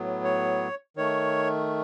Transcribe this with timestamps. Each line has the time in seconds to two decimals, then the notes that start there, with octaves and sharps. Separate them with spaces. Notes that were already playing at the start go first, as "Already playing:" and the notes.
Already playing: A2 F#3 B3
0.24 C#5
0.97 D#3 A3 C#5